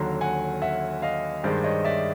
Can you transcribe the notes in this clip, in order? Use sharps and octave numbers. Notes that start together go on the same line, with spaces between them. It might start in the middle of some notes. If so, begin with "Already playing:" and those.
Already playing: D#2 D3 F#3 A#5 C6
F#5 G#5
E5 F#5
D#5 F5
G2 D#3 G#3 C5 D5
C#5 D#5
D5 E5